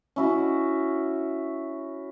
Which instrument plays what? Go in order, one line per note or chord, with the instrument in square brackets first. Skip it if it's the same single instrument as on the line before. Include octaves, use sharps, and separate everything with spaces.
[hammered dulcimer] C#4 E4 F#4